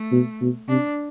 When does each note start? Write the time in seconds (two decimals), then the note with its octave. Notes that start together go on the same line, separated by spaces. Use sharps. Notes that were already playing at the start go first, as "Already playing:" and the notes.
Already playing: A3
0.12 B2
0.41 B2
0.69 C3 D4